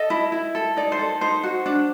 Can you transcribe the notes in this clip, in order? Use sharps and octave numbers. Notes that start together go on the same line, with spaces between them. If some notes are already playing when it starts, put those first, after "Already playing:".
Already playing: A4 D#5
E4
E4
A4
D#4 D5
C5
A4
D#4 C5
F#4
D4